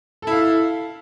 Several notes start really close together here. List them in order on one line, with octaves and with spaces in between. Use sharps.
A4 E4 F5